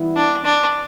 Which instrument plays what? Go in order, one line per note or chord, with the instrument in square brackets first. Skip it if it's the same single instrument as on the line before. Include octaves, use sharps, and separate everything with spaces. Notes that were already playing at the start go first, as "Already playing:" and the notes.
Already playing: [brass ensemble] E3 G3 B3 E4
[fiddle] D4
D4